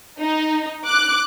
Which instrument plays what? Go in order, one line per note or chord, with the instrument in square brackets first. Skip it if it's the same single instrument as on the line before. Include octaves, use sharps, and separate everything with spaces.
[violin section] D#4
D6 F#6